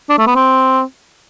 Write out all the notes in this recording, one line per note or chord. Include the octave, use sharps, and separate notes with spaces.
D4
A3
B3
C4